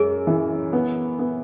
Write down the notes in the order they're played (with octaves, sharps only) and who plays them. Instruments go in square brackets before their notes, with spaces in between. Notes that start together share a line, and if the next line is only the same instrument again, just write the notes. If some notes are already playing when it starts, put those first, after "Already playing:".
Already playing: [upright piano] F#2 G#3 [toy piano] G#4
[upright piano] E3
B3
B3